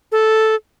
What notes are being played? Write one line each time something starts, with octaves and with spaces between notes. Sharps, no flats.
A4